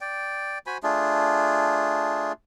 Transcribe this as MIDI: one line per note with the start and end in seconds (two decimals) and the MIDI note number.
0.01 0.58 74
0.01 0.58 79
0.67 0.78 66
0.67 0.78 72
0.67 0.78 80
0.67 0.78 83
0.83 2.32 57
0.83 2.32 62
0.83 2.32 65
0.83 2.32 68